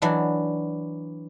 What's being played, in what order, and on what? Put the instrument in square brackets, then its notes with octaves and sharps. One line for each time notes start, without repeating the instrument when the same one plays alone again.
[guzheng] E3 F#3 D4